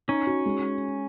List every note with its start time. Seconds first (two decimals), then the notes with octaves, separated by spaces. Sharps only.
0.08 C#4 D#4
0.27 F#4
0.46 G#3